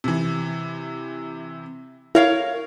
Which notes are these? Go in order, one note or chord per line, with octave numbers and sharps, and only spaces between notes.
C3 E3
E4 A#4 C#5 F5